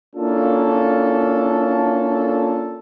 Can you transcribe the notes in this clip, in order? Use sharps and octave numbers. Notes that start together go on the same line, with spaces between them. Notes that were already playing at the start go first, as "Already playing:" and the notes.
A#3 C#4 D4 E4 F4 A4